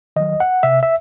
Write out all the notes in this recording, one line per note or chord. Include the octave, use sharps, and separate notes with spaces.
D#3 F#3 D#5
F#5
C3 E5
E5